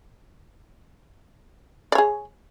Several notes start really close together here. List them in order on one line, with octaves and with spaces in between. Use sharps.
D5 C#5 G#4